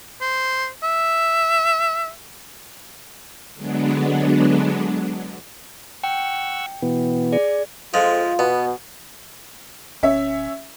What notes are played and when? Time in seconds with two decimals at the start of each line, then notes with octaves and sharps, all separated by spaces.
0.21 C5
0.83 E5
3.55 D3 F#3 G#3 B3 D4
6.03 F#5 G5 C#6 E6
6.82 B2 E3 B3
7.32 G#4 D5
7.94 F2 F3 G#3 F4
8.39 B2 B3
10.03 D1 C#4 E5